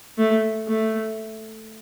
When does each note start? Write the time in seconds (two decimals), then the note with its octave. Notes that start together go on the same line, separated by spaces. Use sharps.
0.18 A3
0.67 A3